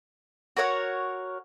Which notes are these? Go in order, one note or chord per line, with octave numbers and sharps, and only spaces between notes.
F#4 A#4 C#5 F#5